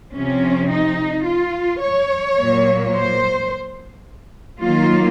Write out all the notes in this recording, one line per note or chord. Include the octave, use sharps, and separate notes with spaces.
C3 F3 C4 C#4
D#4
F4
C#5
A#2 F#3 A#3
C5
D#3 F#3 A#3 F4